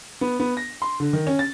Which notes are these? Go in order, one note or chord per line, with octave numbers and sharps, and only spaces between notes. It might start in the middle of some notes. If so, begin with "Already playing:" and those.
B3
B3
A#6
C6
D3
D#3
C#4
A6